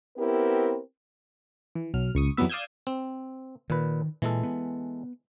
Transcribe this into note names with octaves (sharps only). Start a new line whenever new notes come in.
B3 C4 E4 G4 A#4
E3
B1 F#3 F6
C#2 C#6 D#6
F2 E3 F#3 G3 B3 E5
D5 F5 D#6 E6 G6 G#6
C4
A#2 D#3 B4
A#2 E3 G#3 A4
B3